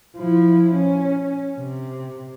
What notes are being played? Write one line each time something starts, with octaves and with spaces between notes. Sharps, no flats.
F3 E4
C#4
C3